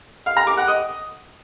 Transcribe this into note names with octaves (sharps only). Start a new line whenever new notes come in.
F5
A#5
D6
F#5
D#5